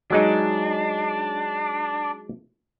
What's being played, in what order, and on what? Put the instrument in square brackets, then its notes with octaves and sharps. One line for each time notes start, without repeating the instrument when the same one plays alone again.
[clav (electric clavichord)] F#3 G#3 D#4 [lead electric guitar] D4